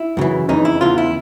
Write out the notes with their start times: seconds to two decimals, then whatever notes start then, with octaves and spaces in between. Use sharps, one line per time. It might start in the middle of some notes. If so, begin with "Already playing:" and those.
Already playing: E4
0.17 F#2 C#3 E3
0.49 F2 C#3 E3 D#4
0.65 E4
0.81 E2 C#3 E3 F4
0.98 E4